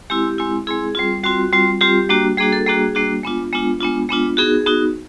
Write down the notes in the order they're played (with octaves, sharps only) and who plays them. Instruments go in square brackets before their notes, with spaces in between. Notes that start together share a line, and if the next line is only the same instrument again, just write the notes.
[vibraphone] G#3 C4 E4 G4
G#3 C4 E4
G#3 C4 E4 G#4
G3 C4 F4
G3 C4 F4 F#4
G3 C4 F4
G3 C4 F4 G4
G3 A#3 D4 F#4
G3 A#3 D4 F#4 G#4
A4
G3 A#3 D4 F#4 G#4
G3 A#3 D4 F#4
G#3 B3 D4 F4
G#3 B3 D4 F4
G#3 B3 D4 F4
G#3 B3 D4 F4
B3 D#4 F#4 G#4
B3 D#4 F#4